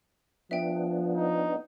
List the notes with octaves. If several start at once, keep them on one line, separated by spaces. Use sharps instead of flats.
F3 B3 D4 E5 G5
D#4